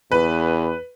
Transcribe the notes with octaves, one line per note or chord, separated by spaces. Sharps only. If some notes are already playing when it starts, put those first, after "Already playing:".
E2 B4